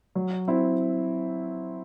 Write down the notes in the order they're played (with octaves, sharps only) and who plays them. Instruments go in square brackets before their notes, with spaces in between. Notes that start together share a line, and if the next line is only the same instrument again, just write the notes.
[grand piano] F#3
C4 E4